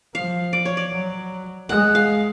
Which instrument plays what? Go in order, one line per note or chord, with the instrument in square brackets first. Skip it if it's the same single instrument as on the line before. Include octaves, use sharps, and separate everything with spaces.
[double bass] F3 [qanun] F5
[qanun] D5
C#5
D5
[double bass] F#3
[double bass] G#3 [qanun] F#5
[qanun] F5